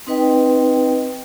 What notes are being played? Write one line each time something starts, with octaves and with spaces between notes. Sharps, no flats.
C4 D#4 B4 D#5 G5